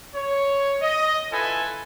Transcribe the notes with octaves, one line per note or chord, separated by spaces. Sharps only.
C#5
D#5
E4 F4 A4 B4 G#5